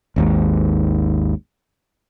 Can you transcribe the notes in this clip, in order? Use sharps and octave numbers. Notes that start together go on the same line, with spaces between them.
G#1 D#2 G#2